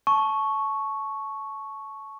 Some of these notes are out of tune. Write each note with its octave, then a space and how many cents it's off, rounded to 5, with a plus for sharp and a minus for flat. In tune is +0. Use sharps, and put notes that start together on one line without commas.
A5 -15 C#6 +0